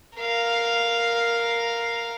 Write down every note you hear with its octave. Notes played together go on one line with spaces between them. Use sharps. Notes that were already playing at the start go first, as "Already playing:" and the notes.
A#4 F5